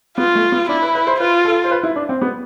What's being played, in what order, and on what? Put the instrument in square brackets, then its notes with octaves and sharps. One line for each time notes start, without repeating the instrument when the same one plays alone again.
[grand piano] B3 [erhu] F4
[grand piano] A3
B3
[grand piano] D4 [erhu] E4
[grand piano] B4
B4
C5
[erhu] F4 [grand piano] B4
[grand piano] A4
C5
B4
E4
D4
C4
B3